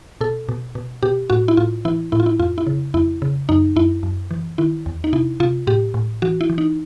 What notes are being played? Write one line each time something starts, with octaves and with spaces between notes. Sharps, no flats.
B2 A4
B2
B2
B2 G4
A2 F#4
E4
A2 F4
E3 E4
A2 E4
F4
E4
F2 F4
E4
C#3
F2 E4
C#3
F#2 D#4
F#2 E4
F#2
E3
D#3 E4
E2
D#4
C3 E4
C3 F4
A2 G4
A2
E3 F#4
E4
E3
D#4